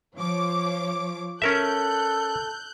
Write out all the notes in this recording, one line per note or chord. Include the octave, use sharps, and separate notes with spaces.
F3 C#5 D6
C#4 A4 A#4 E5 F#6 G6